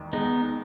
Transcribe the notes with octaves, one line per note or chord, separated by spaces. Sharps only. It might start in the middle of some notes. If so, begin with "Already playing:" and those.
Already playing: E1 D#2 D#3
G#3 B3 D#4